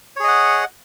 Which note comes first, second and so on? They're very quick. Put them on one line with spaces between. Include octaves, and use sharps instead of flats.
C#5 G#4 D#5 F#5